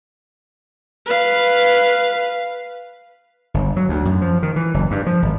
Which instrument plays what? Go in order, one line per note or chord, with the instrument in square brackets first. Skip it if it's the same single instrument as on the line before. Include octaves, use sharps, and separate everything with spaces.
[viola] B4 F5
[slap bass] G1
F#3
D2
F#2
F3
D#3
E3
F#1
G2
F3
G#1